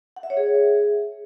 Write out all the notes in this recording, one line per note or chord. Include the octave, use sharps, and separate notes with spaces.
F#5
E5
C#5
G#4